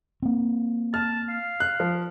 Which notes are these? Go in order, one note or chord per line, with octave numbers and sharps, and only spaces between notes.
A#3 C4
A5 F6
F5
F#6
F3